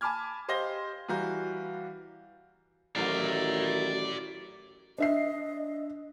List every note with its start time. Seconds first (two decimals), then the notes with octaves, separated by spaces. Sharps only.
0.01 G#5 A5 B5 D6 F6 G#6
0.48 G4 C5 D#5 F5 A#6 G7
1.08 E3 G3 F#4 F5 A#5 G6
2.96 A1 D#3 F#3 E4 D5 F5
4.98 D4 D#5 E5 C7